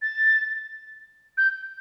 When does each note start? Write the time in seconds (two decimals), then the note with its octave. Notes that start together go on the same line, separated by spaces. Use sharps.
0.02 A6
1.38 G6